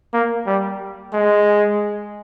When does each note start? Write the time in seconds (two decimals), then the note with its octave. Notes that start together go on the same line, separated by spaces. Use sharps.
0.13 A#3
0.47 G3
1.13 G#3